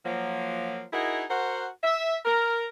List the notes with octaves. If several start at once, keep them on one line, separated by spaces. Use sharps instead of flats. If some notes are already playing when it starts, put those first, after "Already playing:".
F3 F#3 A#3
D#4 E4 F#4 G#4 A#4 D#5
F#4 A#4 C5 F#5
E5
A#4